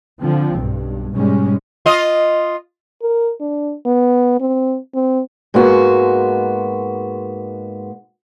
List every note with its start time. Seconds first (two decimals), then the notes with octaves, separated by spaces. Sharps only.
0.20 D3 F3 C4
0.56 B1 G2
1.14 G#2 B2 G3 G#3 C#4
1.86 F4 D#5
3.02 A#4
3.40 D4
3.86 B3
4.40 C4
4.95 C4
5.54 G#2 G#3 A#3 B3 F#4